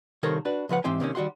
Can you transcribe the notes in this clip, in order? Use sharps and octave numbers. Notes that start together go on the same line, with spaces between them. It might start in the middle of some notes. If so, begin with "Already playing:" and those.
C2 D#3 A4 A#4 C5 C#5
D4 F#4 B4
C#2 F3 B4 F#5
G#2 E3 C4 G4 C5 G#5
C3 D#3 A#3 C#4
D#3 G3 F#4 F#5 C6